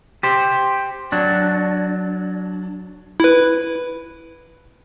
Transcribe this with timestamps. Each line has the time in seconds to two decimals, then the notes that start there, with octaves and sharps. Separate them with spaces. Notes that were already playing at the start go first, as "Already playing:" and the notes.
0.23 G4 C5
1.12 F#3 D4
3.20 E4 B4